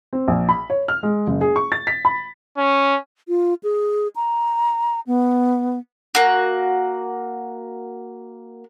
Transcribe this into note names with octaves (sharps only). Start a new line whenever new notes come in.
C4
A#1
B5
C#5
F6
G#3
F#1
G#4
C#6
A6
B6
B5
C#4
F4
G#4
A#5
B3
A#3 F#4